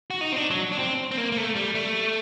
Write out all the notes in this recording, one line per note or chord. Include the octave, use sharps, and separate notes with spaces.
F#4
D#4
C4
D4
F#3
D4
C4
C4
A#3
A#3
A3
G3
A3